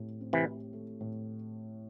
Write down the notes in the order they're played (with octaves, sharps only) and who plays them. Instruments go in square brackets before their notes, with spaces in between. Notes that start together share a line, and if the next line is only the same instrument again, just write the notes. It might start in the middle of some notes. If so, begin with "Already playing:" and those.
Already playing: [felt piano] A2 A3 C4 G4
C4
[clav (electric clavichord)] C3 E3
[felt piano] G4
A3
A2